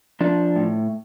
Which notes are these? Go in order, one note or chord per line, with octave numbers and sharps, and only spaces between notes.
F3 D4
A2